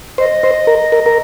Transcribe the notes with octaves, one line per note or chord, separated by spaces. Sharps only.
C5 D#5
C5
A#4
A#4
A#4